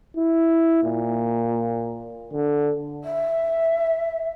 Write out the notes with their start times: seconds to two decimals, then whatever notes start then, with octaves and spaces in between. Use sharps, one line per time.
0.17 E4
0.84 A#2
2.33 D3
3.04 E5